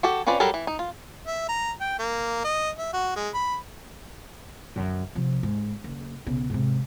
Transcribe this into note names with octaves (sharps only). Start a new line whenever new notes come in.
F#4 G4 A4
C4 C#4 F4 B4 D5
F#3 G3 G4 A4 A#4
E3
D#4
F4
E5
A#5
G5
A#3
D#5
E5
F#4
G#3
B5
F#2 D3
C3 F3
G#2
F#1
B1 C#3
G#2 C3